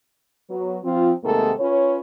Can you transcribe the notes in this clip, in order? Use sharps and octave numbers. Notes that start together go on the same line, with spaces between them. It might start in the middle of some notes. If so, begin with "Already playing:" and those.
F#3 B3
F3 C4 F4
G#2 C3 D#3 A3 A#3 A4
C#4 F4 B4 C#5